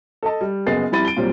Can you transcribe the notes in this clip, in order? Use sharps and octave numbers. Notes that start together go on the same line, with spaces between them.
A4 D#5 A5
G3
F#1 B3 G#4 D#5 A6 C7
F2 G3 E4 B5 A6 D#7
D7 G7
A#2 F#3 G3 C4